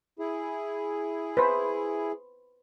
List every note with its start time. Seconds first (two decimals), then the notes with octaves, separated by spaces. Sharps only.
0.19 E4 G#4
1.37 B4 C5